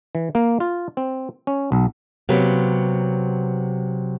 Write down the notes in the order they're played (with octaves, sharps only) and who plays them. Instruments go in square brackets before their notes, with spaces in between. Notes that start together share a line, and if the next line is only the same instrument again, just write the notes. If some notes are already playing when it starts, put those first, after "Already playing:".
[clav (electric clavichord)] E3
A#3
F4
C4
C#4
B1
[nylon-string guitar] C3 F#3 A#3 B3